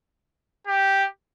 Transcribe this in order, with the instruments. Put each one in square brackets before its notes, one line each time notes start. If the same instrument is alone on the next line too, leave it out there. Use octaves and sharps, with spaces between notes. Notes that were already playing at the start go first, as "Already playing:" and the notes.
[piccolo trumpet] G4